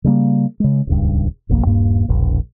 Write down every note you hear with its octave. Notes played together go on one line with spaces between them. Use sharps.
C#3 G3 A3 A#3
C#3 G#3
D#1 C#2 G2
F#1 B1 F2 A#3
D#1 G2 A#3
E1 A#1